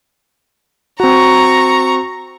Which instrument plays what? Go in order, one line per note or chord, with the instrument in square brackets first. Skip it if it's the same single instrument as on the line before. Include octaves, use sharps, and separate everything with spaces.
[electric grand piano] C4 F#4 [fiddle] A#5 C#6